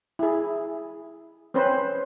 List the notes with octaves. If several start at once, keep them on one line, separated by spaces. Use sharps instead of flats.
E4 G#4
C4 C#4 B4 C5